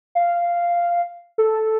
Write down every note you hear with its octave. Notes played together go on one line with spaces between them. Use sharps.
F5
A4